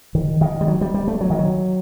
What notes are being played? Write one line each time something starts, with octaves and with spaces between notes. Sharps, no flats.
D#3
D#3
G3
F#3
G3
G3
A3
F#3
D#3
F#3